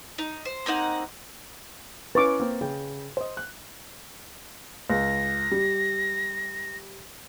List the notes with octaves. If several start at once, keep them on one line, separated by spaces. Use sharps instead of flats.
D#4
C5
A#3 C4 D#4 F#5
C#4 E4 B4 C#6 D6 A6
A#3 C4
C#3 G5
C5 D#5
F#6
C#2 A#6
G3